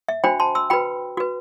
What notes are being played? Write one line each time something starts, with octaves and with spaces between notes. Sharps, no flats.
E5
D4 F#4 C5 G5 B5
A5 C6
C6 E6
F#4 B4 G5 B5
F#4 B4